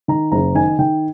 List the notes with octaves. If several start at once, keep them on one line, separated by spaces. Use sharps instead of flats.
D#3 A#5
F#1 A#5
D#3 G#5
D#3 G5